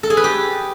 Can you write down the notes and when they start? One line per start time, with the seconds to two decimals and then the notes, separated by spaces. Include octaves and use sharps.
0.03 A4
0.10 G#4
0.17 B4
0.24 G4